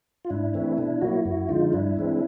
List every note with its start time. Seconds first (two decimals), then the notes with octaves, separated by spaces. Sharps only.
0.25 F4
0.30 G#2 D4 E4
0.54 E3 A3 C4
0.77 B2 D4 E4
1.01 F#3 A#3 E4 F#4
1.25 F#2 E4 F#4
1.49 D3 F3 G#3 D#4 F4
1.73 G2 D4 E4
1.97 E3 G#3 C4